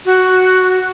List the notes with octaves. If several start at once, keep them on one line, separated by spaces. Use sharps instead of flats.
F#4